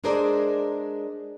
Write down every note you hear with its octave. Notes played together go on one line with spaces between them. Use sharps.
G#3 D4 G#4 A#4 C5 D5